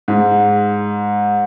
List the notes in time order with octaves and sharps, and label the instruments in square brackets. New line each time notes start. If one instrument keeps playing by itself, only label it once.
[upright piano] G#2